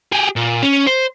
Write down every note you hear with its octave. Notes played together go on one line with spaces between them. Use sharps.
G4 G#4
A#2
C#4
C5